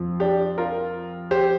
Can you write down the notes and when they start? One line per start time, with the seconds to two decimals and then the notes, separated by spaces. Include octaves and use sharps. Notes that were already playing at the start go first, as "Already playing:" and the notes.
Already playing: F2 F3
0.20 D4 G4
0.58 F4 A#4
1.31 G4 C5